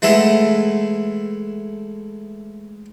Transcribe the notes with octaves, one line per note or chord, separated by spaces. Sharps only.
E3 G#3 A3 B3 A4 E5